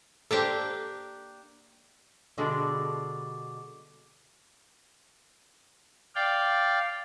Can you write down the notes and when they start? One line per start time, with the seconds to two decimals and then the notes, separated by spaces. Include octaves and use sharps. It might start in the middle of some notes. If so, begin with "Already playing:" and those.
0.31 A#3 D4 G4 A4 C5
2.38 B2 D3 G3 G#3 D5 A5
6.15 D5 F5 G5